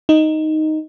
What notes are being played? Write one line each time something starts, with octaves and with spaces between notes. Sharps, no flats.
D#4